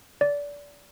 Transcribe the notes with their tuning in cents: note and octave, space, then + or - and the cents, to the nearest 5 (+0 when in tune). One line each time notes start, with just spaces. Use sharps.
D5 -25